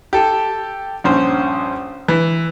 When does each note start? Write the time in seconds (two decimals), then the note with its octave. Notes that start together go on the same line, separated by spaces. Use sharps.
0.13 G4 A4
1.04 A#1 G2 C#4 C5
2.08 E3